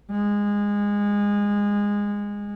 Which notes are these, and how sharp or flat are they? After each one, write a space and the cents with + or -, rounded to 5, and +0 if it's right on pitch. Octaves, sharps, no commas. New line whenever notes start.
G#3 -20